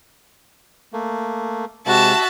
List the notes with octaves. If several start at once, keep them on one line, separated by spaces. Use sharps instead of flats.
A3 A#3
C3 G#3 F#4 E5 A5